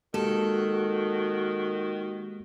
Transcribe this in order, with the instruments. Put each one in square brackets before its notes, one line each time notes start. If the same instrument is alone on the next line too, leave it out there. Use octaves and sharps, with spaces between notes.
[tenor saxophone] D#3 [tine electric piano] G#3 A#3 G4 [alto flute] F#4 [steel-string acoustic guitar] A4